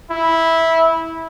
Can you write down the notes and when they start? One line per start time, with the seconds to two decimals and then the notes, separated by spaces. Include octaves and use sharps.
0.11 E4